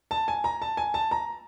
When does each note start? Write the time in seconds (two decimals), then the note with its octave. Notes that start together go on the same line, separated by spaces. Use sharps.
0.11 A5
0.28 G#5
0.44 A#5
0.62 A5
0.77 G#5
0.94 A5
1.11 A#5